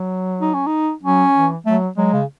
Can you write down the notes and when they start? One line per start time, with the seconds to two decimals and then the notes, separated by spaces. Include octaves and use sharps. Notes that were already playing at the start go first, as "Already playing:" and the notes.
Already playing: F#3
0.41 D#4
0.54 C#4
0.67 D#4
1.03 F#3 C#4
1.34 E3
1.66 F#3 A3
1.97 F#3 G#3
2.13 C#3